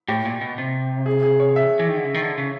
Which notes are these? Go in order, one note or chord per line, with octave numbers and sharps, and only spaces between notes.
A2 G4
A#2
B2
C3
G#4
G#4
C#5
E5
E3
D#3
D3
C#3
D#3
D3
C#3